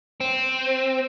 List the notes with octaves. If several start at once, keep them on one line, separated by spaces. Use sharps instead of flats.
C4